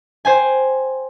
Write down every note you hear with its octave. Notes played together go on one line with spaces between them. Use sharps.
C5 G5 G#5